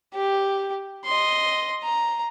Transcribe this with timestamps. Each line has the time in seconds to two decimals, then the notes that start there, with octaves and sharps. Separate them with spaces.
0.14 G4
1.05 D#5 C6
1.83 A#5